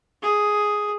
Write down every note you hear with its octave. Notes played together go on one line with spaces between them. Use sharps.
G#4